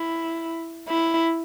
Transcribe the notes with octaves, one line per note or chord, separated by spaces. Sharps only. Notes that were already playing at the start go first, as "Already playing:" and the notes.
Already playing: E4
E4